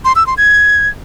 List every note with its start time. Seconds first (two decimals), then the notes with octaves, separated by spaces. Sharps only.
0.05 C6
0.16 E6
0.27 C6
0.38 G#6